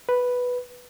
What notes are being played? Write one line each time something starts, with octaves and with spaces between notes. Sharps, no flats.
B4